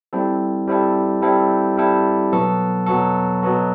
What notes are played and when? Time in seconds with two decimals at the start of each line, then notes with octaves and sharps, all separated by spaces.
0.13 G3 C4 E4 A4
0.67 G3 C4 E4 A4
1.22 G3 C4 E4 A4
1.77 G3 C4 E4 A4
2.32 B2 F#3 B3 F#4 A4
2.87 B2 F#3 B3 F#4 A4
3.42 B2 F#3 B3 F#4 A4